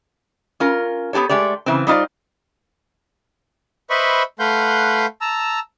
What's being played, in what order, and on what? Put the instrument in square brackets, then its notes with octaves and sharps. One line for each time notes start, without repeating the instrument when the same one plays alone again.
[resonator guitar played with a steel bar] C#4 F4 A#4
B3 C4 G4 A4 C#5
G#3 A3 G4 D5
C#3 E3 C4
G3 D#4 F4 C5 D5
[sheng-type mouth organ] B4 C5 D#5 E5 B5 C#6
A3 B4 F5 F#5 C6 G6
A5 A#5 E6